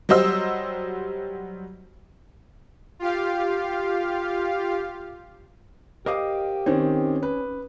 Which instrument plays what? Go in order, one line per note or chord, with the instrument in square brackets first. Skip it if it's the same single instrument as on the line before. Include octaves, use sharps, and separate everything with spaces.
[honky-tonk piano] F#3 G3 C5 D#5 E6
[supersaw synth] F4 G4 F5
[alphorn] G4 [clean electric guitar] A#4 C5 F5 [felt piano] D#5 D6 D#6
[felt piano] D#3 C4 [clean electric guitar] C#4 C#5
[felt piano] B4